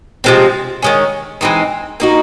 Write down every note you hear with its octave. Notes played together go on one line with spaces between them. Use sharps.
C3 F3 G#3 C4
D#3 G#3 C#4
E3 G#3 C4 D#4
A#3 D#4 F#4